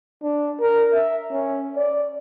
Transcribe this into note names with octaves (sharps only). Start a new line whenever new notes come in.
D4
A#4
E5
C#4
D5